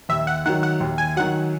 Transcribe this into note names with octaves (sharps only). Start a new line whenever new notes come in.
D#2 E5
F#5
D#3 F#3 F#5
F#5
D#2
G#5
D#3 F#3 F#5